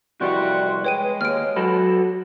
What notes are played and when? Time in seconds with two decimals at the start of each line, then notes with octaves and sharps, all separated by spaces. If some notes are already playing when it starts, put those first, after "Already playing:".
0.21 C2 F2 E3 G3 F#4 C6
0.85 G#3 B4 C#5 G5 D#7
1.21 D#2 C#5 F6 D7
1.56 F#3 F#4 A4 B4